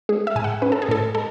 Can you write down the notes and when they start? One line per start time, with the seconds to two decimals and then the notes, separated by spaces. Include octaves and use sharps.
0.09 G#3 G#4
0.27 E5
0.36 A2 G#5
0.44 F#5
0.62 C#4 B4
0.72 A4
0.82 G#4
0.89 A2 A4
1.15 G#3 A4